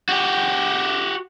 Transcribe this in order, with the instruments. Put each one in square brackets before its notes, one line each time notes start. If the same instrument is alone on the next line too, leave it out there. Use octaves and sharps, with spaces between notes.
[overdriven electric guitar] F#4 G4